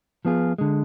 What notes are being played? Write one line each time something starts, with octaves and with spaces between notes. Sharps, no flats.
F3 B3 F4 G#4
D3 G#3